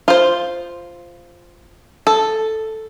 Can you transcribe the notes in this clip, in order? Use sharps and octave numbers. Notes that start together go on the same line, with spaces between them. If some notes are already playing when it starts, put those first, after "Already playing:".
F4 C5
A4